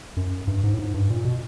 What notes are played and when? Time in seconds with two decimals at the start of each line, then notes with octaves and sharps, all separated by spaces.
0.17 F#2
0.48 G2
0.64 G#2
0.73 A2
0.79 G#2
0.94 G2
1.10 A#2
1.25 B2